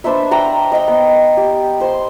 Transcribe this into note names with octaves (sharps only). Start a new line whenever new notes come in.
D4 B4 C5 E5
E5 F#5 G5 A#5
D#5 G5
B3
G4
C5 C6